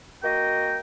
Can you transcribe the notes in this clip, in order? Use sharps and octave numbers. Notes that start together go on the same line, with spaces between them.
A#3 F#4 D#5 G5